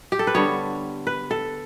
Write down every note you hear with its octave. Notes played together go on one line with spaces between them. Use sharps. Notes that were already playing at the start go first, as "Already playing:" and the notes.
G4
A4
B4
D3 G3 B3 C#5
B4
A4